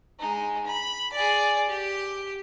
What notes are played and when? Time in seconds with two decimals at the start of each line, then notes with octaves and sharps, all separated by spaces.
0.20 G#3 D#4
0.66 B5
1.13 G#4 D5
1.69 G4